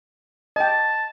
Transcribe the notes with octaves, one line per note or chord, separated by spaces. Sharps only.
D#5 G5 A5